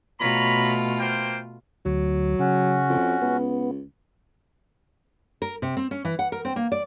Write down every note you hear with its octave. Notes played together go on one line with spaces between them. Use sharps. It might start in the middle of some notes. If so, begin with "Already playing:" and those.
B2 A3 F4 C#5 A#5 B5
A#3 C5 G5
D2 F#3
C#3 C#4 F#4
F2
C#2 B3
A#4
C3
C4
C#4
E3
F#5
A#4
C4
A#3
D5